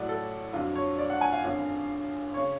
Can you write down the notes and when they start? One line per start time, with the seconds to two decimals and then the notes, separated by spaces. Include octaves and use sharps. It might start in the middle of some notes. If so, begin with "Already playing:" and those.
Already playing: A1 A2 F#3 A3 D5 F#5
0.09 A4
0.53 F2 D3 F#3 F4
0.75 C#5
0.98 D5
1.10 F#5
1.21 G#5
1.33 F5
1.44 G#1 F#2 D3
2.34 C#3 C#5